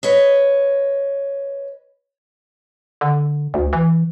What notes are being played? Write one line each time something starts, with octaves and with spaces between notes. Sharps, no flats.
B4 C#5 D#5
D3
D2
E3